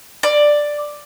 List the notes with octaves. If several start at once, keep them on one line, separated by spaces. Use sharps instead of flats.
D5